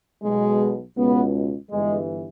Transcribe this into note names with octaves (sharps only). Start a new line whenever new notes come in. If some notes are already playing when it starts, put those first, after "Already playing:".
B1 B2 G#3
C#2 B2 B3
G1 G2 E3 G#3